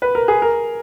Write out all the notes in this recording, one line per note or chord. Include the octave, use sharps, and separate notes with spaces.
B4
A#4
G#4
A#4